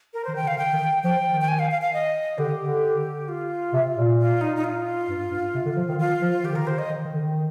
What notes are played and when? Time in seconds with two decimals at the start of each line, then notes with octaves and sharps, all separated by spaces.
0.14 A#4
0.25 D#3 C5
0.36 G5
0.43 D3
0.47 F5
0.58 D3 G5
0.73 D#3
1.03 F3 G5
1.26 D#3
1.41 G5
1.48 G#5
1.59 F5
1.71 F5
1.82 F5
1.93 D#5
2.38 D3 G4
2.61 D3
3.28 F4
3.73 C3
3.97 A#2
4.19 F4
4.41 D#4
4.56 D#4
4.64 F4
5.09 G2
5.31 G2
5.55 C3
5.65 D3
5.76 F3
5.88 D#3
5.99 D#3 F4
6.21 F3
6.44 D#3 G4
6.51 D3
6.56 D#3 A#4
6.67 D3 C5
6.79 D#5
6.89 D#3
7.05 D#3
7.14 D3
7.20 D#3